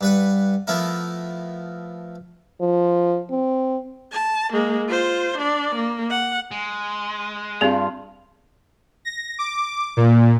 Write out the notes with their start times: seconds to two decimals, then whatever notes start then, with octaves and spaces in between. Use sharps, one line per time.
0.01 G2 B4 F#5
0.67 F3 A3 B3 E4 A#4
2.61 F3
3.31 C4
4.11 A5
4.53 G#3 A#3
4.89 F4 C5
5.38 D4 D5
5.76 A#3
6.10 F#5
6.51 G#3
7.61 G2 C4 F4 G#4
9.05 A#6
9.39 D6
9.97 A#2